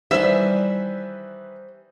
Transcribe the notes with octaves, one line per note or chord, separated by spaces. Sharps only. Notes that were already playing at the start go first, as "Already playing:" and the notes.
D#3 E3 G3 B4 C5 E5 G#5